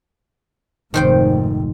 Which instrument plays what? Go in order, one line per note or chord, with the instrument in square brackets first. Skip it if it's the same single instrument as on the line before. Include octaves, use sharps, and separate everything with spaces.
[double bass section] F1 G#2 [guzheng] D#3 C5 G5